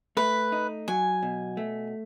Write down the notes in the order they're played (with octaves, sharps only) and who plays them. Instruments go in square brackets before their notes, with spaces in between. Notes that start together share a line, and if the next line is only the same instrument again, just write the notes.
[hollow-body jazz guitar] A3 [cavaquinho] B4
[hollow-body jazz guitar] D#4
[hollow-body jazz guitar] F#3 [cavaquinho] G#5
[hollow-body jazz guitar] B2
A3